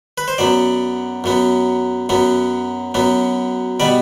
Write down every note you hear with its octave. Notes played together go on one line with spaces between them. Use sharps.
B4
C5
F#2 F#3 B3 D5
F#2 F#3 B3
F#2 F#3 B3
F#2 F#3 B3
B2 G3 B3 D5